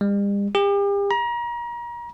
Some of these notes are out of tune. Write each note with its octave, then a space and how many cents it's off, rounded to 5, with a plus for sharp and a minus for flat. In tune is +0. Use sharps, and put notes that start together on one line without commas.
G3 +45
G4 +40
A#5 +35